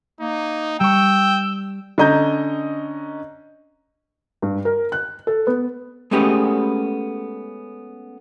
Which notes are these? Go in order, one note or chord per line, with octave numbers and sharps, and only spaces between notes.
A#3 D#4
G3 G5 C#6 E6
D3 C#4 D#5 A#5 G6
G2
A#4
F#6
A4
B3
G#3 A3 B3 C#4 G4 B4